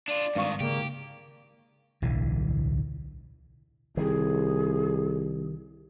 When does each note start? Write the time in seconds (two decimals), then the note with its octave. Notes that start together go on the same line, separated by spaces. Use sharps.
0.08 D4 F4 D5
0.35 G#1 G2 D#3 F5 C#6
0.60 C#3 A#3 G4
2.02 D1 B1 D3 E3
3.97 C2 D#3 G3 G#4